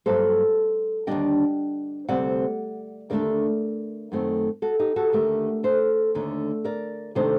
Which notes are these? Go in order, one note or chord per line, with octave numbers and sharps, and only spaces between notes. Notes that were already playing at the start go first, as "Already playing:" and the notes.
G2 F#3 A#3 A4 C5
D#2 D3 G3 D4 D#5 G5
D2 C3 G3 C4 D5 F#5
D#2 D3 A3 D4 A#4 D5
F#2 D#3 A3 C4
F#4 A4
D#4 G4
F#4 A4
D#2 D3 A3 G4 A#4
A4 C5
D#2 D3 A3 D4
A#4 D5
C3 D#3 A3 D4 A4 C5